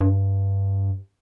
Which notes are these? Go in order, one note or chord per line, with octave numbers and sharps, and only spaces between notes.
G2